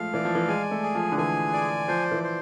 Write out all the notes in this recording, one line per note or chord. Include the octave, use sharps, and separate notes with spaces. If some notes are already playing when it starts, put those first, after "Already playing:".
Already playing: F3 G#3 A3 F5
E3 D5
F3
E3
G#3 G#5
A3
G#4
F3
D3
E3 G#5
D5
F3 C5
E3
C5